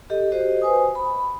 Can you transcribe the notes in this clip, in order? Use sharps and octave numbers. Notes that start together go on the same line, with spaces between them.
G4 A4 D#5
F#4 G4 C5 D#5
B4 C5 G#5 D#6
B5